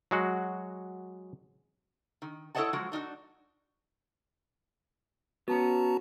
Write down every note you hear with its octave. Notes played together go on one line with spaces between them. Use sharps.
F#3 G#3 F#4
D#3
E4 A4 C#5 D#5 F#5 A5
F3 F#3 G#3 F#4
D4 D#4 F4 F#4
B3 C#4 F#4 A5 A#5